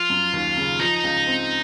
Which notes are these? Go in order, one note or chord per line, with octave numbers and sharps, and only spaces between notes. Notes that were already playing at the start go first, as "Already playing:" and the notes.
Already playing: F3 F4
F#2
D#2
C#3
F3 D#4
C#2
C4